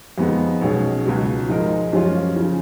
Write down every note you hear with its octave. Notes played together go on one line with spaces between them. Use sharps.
F2 D#3 G#3 B3 D#4
B1 B2 G#3 C#4 G#4
C#2 B2 F#3
G#2 F3 G#3 D#4 A#4
F#2 F3 G#3 C#4 F4
C#3 F3